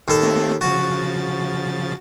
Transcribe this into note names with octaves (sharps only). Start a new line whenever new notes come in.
D#2 A4
A3 A#3 C4
C#3 F3 F#4 A6